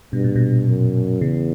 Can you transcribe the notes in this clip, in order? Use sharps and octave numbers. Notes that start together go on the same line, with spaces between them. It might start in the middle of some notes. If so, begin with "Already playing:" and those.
G2 B2
A#2
B2
F#2
E2 C#3